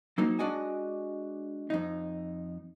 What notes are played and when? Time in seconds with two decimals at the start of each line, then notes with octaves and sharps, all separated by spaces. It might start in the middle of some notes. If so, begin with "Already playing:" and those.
0.18 F#3 A#3 C4 D#4
0.39 G#3 D4 F#4 D5 D#5 G#5
1.70 F2 D#4